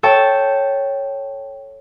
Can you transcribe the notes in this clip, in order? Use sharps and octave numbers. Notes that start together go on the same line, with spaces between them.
A4 C#5 G5 A5